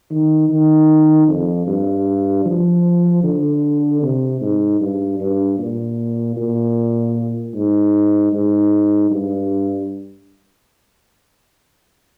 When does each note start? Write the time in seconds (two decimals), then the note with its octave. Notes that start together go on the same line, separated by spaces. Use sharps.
0.11 D#3
0.49 D#3
1.28 F2
1.67 G2
2.46 F3
3.23 D3
4.03 C3
4.41 G#2
4.81 G2
5.20 G2
5.58 A#2
6.37 A#2
7.54 G#2
8.33 G#2
9.11 G2